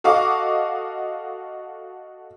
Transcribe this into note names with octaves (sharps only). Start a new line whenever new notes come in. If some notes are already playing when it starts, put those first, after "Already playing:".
F#4 A4 D#5 F5 C#6 D6